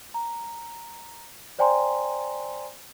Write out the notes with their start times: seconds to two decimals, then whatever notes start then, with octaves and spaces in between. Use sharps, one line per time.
0.14 A#5
1.59 C5 D5 G5 G#5 A#5 C6